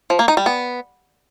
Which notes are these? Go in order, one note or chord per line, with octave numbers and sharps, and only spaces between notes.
F3
A#3
D#4
G3
B3